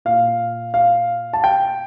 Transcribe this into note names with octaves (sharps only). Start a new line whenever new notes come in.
A#2 F5
F5
A5
G5